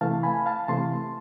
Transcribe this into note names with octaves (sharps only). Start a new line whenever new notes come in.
C3 E3 A3 F5 A5
G#5 B5
F5 A5
C3 E3 A3 A5 C6